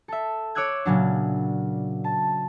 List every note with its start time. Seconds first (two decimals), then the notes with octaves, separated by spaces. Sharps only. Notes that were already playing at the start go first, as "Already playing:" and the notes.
0.08 A4 E5
0.55 C#5 D6 E6 F#6 G#6
0.85 A#2 C#3 F#3 D4
2.04 A5